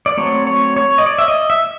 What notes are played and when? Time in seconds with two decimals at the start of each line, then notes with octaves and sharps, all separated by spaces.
0.06 D5
0.17 F#3 A3 C4 C#5
0.47 C#5
0.77 C#5
0.98 D#5
1.06 D5
1.19 E5
1.28 D#5
1.50 E5